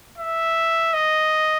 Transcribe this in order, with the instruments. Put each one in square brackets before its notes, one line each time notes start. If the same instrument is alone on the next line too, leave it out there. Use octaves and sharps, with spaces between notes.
[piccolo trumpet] E5
D#5